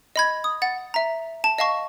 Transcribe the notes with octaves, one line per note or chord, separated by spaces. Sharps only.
D#5 B5 G#6
D#6
F#5 A6
E5 A#5
A5
D#5 F5 A5 C#6